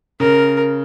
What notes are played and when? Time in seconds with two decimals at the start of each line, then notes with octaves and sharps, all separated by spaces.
0.20 C#3 A#4